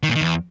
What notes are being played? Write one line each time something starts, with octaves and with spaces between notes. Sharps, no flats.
D#3
A#2
D#3
E2